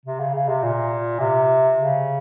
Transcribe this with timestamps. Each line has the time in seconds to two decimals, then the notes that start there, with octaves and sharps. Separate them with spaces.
0.05 C3
0.20 C#3
0.34 C#3
0.48 C3
0.63 A#2
1.20 C3
1.77 C#3